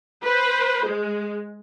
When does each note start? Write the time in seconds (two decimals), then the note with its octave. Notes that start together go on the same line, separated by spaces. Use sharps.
0.23 B4 C5
0.86 G#3